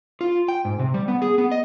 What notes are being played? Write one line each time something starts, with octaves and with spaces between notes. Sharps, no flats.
F4
G5
G#2
C3
G3
B3
G#4
B3
D#5